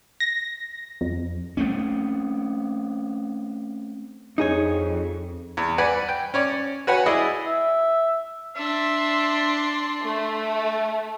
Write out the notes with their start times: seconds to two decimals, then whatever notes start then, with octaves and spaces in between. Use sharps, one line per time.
0.20 A#6
1.01 F2
1.57 A3 C4 C#4
4.38 F2 D#4 G#4 C#5
5.57 E2
5.78 B4 D5 F#5 G#5
6.09 G5
6.34 C#4 C#5 D5
6.87 F#4 B4 C#5 F#5 G#5
7.06 E4 G#4 D5 D#5
7.46 E5
8.56 D4 E5 C6
10.03 A3 A4